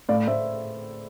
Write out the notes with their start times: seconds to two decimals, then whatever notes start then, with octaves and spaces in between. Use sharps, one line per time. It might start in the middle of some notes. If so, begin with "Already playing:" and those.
0.09 A2 D5 F5
0.27 A2 C5 E5